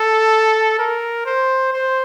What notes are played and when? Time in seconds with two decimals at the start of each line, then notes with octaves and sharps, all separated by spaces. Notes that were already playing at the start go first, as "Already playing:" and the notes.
Already playing: A4
0.79 A#4
1.26 C5
1.73 C5